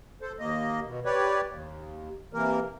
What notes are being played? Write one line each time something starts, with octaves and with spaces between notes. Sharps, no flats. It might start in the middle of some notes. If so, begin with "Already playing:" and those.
A4 C5
D#2 A#3 D#5
B2
G4 B4 C#5 D5
D#2
C3 E3 A#3 A#4